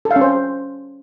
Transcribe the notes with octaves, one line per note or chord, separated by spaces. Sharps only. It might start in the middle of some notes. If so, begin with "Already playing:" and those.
A4
F5
C#4
C5